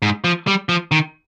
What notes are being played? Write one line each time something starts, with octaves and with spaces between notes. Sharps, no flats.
G#2
F3
G3
F3
D#3